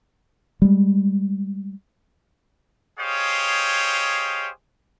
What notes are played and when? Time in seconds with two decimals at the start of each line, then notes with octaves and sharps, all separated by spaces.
0.62 G3 G#3
2.99 G4 G#4 C5 C#5 D#5 F5